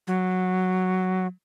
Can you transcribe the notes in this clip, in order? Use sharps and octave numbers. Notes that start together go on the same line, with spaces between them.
F#3